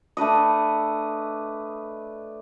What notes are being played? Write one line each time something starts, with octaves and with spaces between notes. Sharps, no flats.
A3 D4 B4 D#5